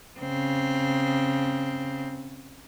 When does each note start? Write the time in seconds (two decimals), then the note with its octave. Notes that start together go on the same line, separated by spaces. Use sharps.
0.19 C#3 C4